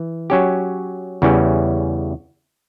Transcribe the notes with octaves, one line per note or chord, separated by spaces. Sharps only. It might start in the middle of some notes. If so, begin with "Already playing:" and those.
Already playing: E3
F#3 C#4 G4
E2 C#3 E3 G3 C#4